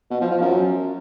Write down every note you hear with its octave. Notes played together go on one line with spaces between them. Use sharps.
B2
F3
F3
F#2